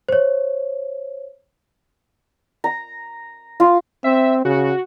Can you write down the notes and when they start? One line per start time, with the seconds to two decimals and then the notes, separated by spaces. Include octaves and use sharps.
0.09 C5 C#5
2.64 A#5
3.60 F4
4.04 C4 E5
4.45 C#3 F#4